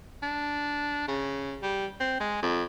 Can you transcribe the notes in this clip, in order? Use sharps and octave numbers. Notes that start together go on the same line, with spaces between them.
D4
C#3
G3
C4
G#3
F2